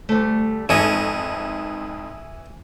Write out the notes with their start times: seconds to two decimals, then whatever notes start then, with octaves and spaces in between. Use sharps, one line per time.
0.09 D2 G3 A3
0.69 F2 G#2 E3 C#4 D#5 G#5 A5